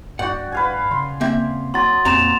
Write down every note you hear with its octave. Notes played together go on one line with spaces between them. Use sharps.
G2 F#4 D5 F#5 G5
B4 F5 G#5
C#3 C6
A#3 C4 E5
F#3 C6 D#6 A6
F2 A#2 C4 A#5 E7 F7